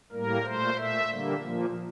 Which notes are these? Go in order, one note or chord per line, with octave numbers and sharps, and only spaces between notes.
A2 G3 A#3 A#4
A#2 A3 C5
A#2 A3 E5
D3 G3 A#3
A#2 F3 A#3